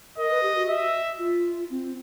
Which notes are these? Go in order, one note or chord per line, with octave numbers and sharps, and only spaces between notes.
A#4 D#5
B4
G4
F#4
E5
F4
C4